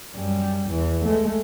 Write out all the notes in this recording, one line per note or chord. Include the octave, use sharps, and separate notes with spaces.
F#2 G3
E2 E3
G#3 A3